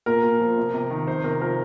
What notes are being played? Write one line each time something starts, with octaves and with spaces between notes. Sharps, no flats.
A#2 A#4
A#2
F3
C3
C3
D#3
C3 C5
C3 A#4
F3 A#4